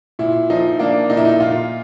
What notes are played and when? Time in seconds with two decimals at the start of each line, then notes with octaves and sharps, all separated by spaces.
0.19 A#2 E4
0.50 F3 D#4
0.79 A#3 D4
1.10 A#2 D#4
1.17 E4
1.25 D#4
1.40 A#2 F4